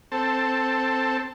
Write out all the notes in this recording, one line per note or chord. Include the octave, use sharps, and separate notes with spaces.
C4 A4